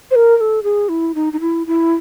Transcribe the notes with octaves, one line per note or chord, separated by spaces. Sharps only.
C5
A#4
A#4
A4
G#4
E4
D#4
D#4
E4
E4